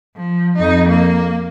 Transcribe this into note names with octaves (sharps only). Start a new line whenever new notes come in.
F3
F2 D#4
A#3